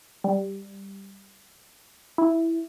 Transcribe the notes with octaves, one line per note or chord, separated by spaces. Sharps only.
G3
E4